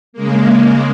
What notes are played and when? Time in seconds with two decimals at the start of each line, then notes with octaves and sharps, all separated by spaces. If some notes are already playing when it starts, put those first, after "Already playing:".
0.13 C#3 G#3 A#3